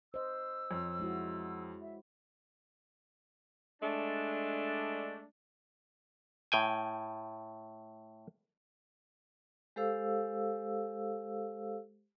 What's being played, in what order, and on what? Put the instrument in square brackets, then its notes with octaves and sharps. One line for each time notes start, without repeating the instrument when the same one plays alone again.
[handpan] C5 D#5 [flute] E6
[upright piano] F2 [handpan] C#5
[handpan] G#3 E4 F#4
[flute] E5
[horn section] G#3 A3 D4
[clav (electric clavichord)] A2 G5 G#5
[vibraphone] G#3 G4 A4 C5 F5 E6